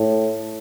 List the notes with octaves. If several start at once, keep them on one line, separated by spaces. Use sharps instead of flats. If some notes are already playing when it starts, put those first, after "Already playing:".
Already playing: A2